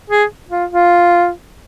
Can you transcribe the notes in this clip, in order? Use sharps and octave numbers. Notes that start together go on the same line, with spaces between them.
G#4
F4
F4